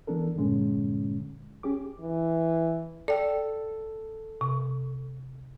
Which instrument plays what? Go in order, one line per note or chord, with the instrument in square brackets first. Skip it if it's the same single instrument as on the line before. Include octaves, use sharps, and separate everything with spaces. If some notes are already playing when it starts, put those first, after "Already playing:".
[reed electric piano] E3 B3 D4 A4 A#4
E2 G2 A#2 D3 G#3 C#4
C#4 G4 G#4 D6
[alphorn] E3
[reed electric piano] A4 [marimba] D5 G5
[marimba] C3